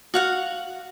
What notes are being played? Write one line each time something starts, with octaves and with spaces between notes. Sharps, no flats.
F#4 F5 F#5